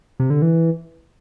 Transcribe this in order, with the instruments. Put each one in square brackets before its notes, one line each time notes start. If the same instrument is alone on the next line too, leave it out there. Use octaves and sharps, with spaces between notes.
[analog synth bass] C3
D3
E3